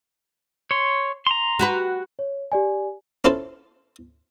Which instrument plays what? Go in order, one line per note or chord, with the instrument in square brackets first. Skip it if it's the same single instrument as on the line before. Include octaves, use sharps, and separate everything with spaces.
[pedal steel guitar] C#5 C6
A#5 C6
[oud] F#4 G4 B4
[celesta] C#5
G4 D5 G#5
[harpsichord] C#4 E4 F4 A4 C5